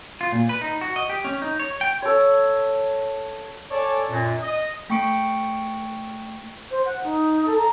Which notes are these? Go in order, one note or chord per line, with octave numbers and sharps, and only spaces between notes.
F4
A#2
B4
D#4
F#4
D#5
G4
C#4
D#4
C#5
G5
A4 C#5
A4 C#5 D5 G#5
F#2 A#2
D#5
A3 G5 C#6 C#7 D7
C5
F#5
D#4
A4
A#5